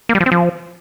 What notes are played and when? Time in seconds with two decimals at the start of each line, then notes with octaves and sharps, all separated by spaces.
0.09 A#3
0.15 G3
0.20 F3
0.26 C4
0.32 F3